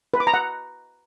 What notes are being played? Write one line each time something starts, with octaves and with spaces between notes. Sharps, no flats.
B4
D6
A#5
F#5